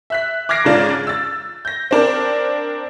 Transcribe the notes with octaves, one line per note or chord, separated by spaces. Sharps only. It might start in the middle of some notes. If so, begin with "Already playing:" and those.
E5 F#6 B6
D6 F6 G#6 A#6 C7 D7
G#2 C#3 D4 F4
E6 A6
G6 A#6
C4 D4 A#4